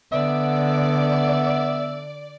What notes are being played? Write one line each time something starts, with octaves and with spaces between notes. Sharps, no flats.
D3 B3 D5 E5